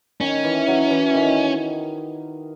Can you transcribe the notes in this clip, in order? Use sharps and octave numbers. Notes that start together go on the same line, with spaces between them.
D#3 C#4
E3
F#3
E3
D#3